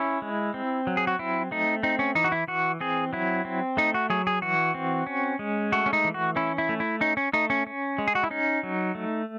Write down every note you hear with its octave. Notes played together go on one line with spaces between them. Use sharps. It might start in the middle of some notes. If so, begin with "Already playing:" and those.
Already playing: C#4 E4
G#3
C4
F#3
G#4
F#4
C4 E4
A3 D#4
C4 D#4
C#4
E3 D#4
F#4
E4
E3 F#4
C4 G#4
F#3 E4
C4
A3 D#4
F#4
F#3 G#4
G#4
E3 F#4
C4
C#4
G#3
A3 F#4
C#4
D#4
E3
F#4
C#4 E4
E4
A3
E4
C#4 D#4
C#4
A3 D#4
C#4
C#4
G#3
G#4
F#4
E4
C#4 D#4
F#3
A3